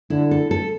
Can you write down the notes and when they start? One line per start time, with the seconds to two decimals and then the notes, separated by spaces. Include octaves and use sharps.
0.10 D3 E4
0.31 A4
0.51 A4